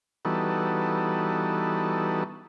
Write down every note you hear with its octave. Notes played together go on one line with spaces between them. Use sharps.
E3 G3 B3 D#4 F#4 A4